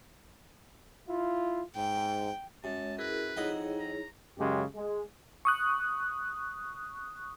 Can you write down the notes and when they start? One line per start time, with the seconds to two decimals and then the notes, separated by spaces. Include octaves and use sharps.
1.09 E4 F4
1.75 G#2 G5
2.64 F#2 G#3 C#5 A5
2.98 E4 G#4 A#4 B4
3.37 F2 D#4 E4 G#4 C#5 D#5 F#5
3.79 A#5
4.38 F#2 C#3 G#3 G4
4.75 G#3
5.45 C#6 D#6 F#6